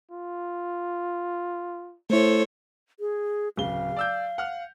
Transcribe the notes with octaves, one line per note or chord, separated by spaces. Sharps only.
F4
A3 E4 A4 C5 C#5
G#4
D1 C#3 F5 G7
D5 E6 G6
F#5 F6